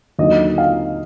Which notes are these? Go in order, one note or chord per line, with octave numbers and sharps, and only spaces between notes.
D#2 D3 F#3 D#5
F5